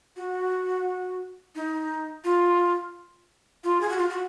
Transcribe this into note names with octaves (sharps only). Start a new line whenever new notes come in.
F#4
D#4
F4
F4
G#4
F#4
F4
F#4